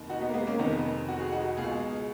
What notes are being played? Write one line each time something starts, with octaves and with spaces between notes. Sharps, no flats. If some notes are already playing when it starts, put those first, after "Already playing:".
Already playing: F1 D#2 D#3
D#4 F#4
B3 D#4
A#3
G#3 B3
A#3 C#4
F1 F2 D#3 B3 D#4
F#4
G#4
D#4 F#4
C#2 B2 F4 G#4